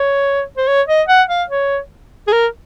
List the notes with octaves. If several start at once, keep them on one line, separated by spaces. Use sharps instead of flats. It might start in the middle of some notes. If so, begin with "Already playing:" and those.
Already playing: C#5
C5
C#5
D#5
F#5
F5
C#5
G#4
A#4